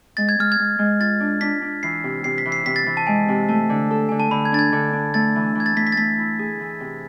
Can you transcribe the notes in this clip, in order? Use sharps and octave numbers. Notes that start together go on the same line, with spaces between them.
G#3 A6
G#6
G#3 F6
G#6
G#3
G#3
F4 A6
D4
D4 B6
D4
E3 C7
C3
C3 C7
B6
E3
C7
C3 B6
A6
E3
A5
G#3 G#5
C3
A3 A5
D3
A4
D3 G#5
A5
D3 B5
G#6
D4 A6
G#6
D3
D4
A3 A6
E3
E3 G#6
A6
A3 B6
B6
A6
A3 B6
E4
G#4
E3
C3